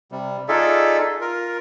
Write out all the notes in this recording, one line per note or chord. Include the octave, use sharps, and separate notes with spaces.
C3 G3
D#4 F4 G#4 A4 D5 E5
F4 A#4